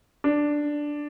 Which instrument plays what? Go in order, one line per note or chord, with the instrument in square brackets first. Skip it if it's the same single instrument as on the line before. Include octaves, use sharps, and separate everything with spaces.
[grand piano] D4